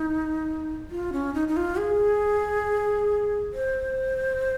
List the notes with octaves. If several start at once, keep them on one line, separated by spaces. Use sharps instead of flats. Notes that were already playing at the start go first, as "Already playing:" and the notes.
Already playing: D#4
F4
C#4
D#4
D#4
F4
G#4
C5